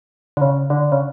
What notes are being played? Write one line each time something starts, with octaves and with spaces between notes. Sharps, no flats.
D3
C#3
D3
C#3